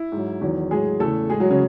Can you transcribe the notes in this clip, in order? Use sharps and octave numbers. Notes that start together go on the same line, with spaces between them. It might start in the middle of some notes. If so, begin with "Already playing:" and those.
Already playing: E4
G#2 F#3
E2 D#3 F#3
A2 F#3 G#3 G#4
E2 C#3 E3 A3 A4
A2 G#3 G#4
F#3 F#4
C#3 C#4